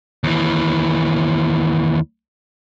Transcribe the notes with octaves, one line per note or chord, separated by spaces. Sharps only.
D#2 E3